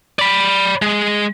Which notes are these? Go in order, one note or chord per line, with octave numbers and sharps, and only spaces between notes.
D5 B5
G#3